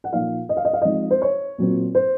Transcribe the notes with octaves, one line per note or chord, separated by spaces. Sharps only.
F#5
A#2 F3 A#3 D#4 F5
D#5
F5
D#5
F5
F3 G#3 C4 D#4 D#5
C5
C#5
A#2 F#3 C4
C5